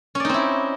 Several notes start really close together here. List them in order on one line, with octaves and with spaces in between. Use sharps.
C#4 D5 D#4 C4 E4